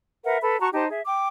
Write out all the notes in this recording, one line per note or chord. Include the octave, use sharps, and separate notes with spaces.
A#4 B4 E5 F#5
A4 B4 B5
F#4 A5 A#5 C#6
D#4 G4 C5 A5
G#4 E5
G5 D6